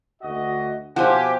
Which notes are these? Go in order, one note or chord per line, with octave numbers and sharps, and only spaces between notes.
D2 F#4 D#5
B2 F3 C4 G4 C5 F#5 G#5